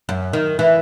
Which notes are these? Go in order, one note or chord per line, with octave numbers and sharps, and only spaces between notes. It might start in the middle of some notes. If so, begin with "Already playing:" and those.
F#2
D#3
E3